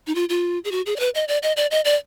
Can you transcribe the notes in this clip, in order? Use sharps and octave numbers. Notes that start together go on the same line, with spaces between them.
D#4
F4
F4
G#4
F#4
G#4
D5
B4
D#5
D5
D#5
D5
D#5
D5